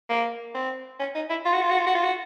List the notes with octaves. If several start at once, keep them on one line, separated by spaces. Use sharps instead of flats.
A#3
C4
C#4
D#4
E4
F4
F#4
F4
F#4
F4
F#4
F4
F#4